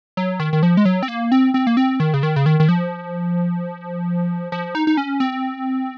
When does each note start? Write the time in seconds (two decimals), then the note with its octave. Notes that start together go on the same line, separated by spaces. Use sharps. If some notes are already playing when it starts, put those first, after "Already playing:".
0.17 F#3
0.40 D#3
0.53 D#3
0.63 F3
0.77 G#3
0.85 F#3
1.03 C4
1.08 A#3
1.32 C4
1.54 C4
1.67 A#3
1.77 C4
2.00 D#3
2.14 C#3
2.23 D#3
2.36 C#3
2.46 D#3
2.60 D#3
2.69 F3
4.52 F3
4.75 D#4
4.87 D#4
4.97 C#4
5.20 C4